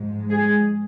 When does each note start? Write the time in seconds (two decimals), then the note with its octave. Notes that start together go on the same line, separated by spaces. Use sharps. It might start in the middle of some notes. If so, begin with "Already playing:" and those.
Already playing: G#2 F3 G#3
0.30 G#4